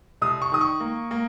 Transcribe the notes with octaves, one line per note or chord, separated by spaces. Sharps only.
C2 D#6
C#6
D#3 D#6
C#6
A#3
A#3